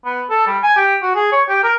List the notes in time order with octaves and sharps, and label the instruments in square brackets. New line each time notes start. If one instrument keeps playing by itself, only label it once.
[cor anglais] B3
A4
G3
G#5
G4
F#4
G#4
C#5
G4
A#4